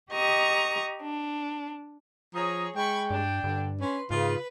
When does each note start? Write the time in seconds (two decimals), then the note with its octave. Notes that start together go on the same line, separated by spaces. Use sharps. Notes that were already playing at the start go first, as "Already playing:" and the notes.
0.11 G4 D#5 A#5 C#6 D#6
1.01 D4
2.34 F3 G#4 C#5 A#5 D#6
2.75 G#3 G5 B5 C#6
3.10 G2 D4
3.44 G2 D3
3.80 C#4 B4 C6
4.10 G#2 C#3 F4 B4